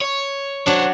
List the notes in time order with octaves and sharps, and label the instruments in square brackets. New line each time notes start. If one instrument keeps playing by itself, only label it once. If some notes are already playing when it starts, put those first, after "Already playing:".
[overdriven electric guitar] C#5
[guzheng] F#3 D4 [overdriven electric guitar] C5 C#5